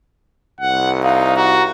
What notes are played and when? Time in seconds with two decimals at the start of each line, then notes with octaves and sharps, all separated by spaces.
0.61 C2 F#5
1.03 D#4 F5
1.37 F#4 A#5